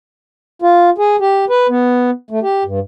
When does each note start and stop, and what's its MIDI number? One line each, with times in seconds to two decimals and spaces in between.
0.62 0.90 65
0.98 1.16 68
1.20 1.45 67
1.50 1.67 71
1.69 2.10 59
2.30 2.40 57
2.43 2.63 67
2.65 2.80 43